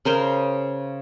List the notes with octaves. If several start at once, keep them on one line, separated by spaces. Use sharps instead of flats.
C#3 A#4 C5